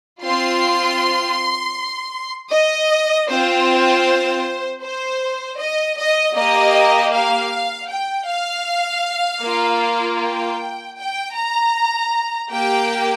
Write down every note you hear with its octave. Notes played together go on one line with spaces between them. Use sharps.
C4 F4 C6
D#5
C4 F4 C5
C5
D#5
D#5
A#3 G4 D#5
F5
G5
F5
A#3 F4
G5
G5
A#5
A#3 G4 G5